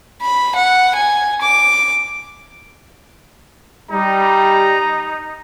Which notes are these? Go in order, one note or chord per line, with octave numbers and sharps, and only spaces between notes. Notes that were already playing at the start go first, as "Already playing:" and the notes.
B5
F#5
G#5
D6
G3 D#4 A#5